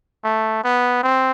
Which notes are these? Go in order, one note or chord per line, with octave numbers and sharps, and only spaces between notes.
A3
B3
C4